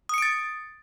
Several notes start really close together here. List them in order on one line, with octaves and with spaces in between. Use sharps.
D#6 C#7 D7 A6